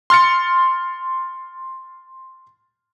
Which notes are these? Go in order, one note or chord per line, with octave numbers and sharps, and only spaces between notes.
C6 F6 A6 C#7